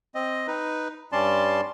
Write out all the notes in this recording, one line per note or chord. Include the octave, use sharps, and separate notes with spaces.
C4 D#5
D#4 B4
G2 G3 C#4 D5 A5 C6